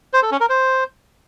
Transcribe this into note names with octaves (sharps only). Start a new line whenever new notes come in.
C5
A4
C#4
A#4
C5